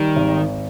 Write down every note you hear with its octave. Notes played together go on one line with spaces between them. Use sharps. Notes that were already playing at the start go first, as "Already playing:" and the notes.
Already playing: D#3 G3
G#1